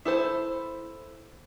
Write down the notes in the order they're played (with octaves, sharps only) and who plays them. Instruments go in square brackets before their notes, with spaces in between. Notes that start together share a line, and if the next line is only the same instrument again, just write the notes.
[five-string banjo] E4 A4 C5